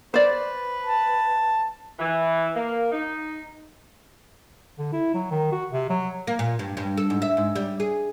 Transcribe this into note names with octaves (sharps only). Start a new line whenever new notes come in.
B4 C5 D5
A5
E3
A#3
D#4
D3
E4
F#3
D#3
F#4
C3
F#3
A#3
A#2
G2
G2
A4
G#2
E5
G#2
G3
G#4